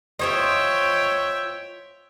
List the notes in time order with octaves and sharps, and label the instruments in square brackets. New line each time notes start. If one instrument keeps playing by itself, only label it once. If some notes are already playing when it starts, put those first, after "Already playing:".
[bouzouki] F4 C5 D#5 [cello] C#5 [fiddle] E5 G5